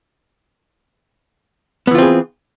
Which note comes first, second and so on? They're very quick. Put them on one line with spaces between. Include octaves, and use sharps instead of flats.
B3 E3 F4 C4 G#4